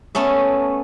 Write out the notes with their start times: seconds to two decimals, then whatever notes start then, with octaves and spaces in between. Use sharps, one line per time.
0.15 A3 B3 C#4 E5